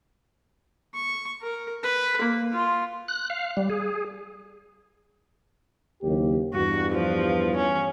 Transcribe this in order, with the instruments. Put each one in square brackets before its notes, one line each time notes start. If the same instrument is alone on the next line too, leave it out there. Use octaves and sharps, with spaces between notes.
[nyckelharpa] C#6
A#4
B4
A#3
F4
[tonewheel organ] F#6
F5
G3
G#4
[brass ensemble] F#1 D#2 G4
[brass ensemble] E2 G2 [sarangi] F#4
[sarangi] F3
C#4